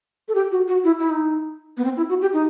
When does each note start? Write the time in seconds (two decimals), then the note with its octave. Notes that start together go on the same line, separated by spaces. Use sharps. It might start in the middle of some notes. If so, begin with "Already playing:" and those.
0.28 A4
0.35 G4
0.52 F#4
0.68 F#4
0.84 E4
0.99 E4
1.10 D#4
1.77 B3
1.85 C4
1.97 E4
2.09 F#4
2.21 G4
2.33 D#4